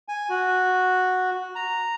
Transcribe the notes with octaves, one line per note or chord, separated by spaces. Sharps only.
G#5
F#4
A#5